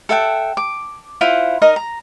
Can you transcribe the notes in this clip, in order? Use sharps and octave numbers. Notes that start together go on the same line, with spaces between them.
A4 E5 F#5 G5
D6
E4 F4 C5 F#5
D#4 A#4 D#5
A#5